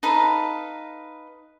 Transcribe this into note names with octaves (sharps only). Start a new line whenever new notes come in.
D#4 A4 B4 F5